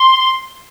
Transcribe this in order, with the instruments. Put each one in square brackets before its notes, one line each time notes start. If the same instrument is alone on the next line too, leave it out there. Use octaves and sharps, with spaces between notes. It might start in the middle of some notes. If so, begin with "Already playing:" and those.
Already playing: [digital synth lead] C6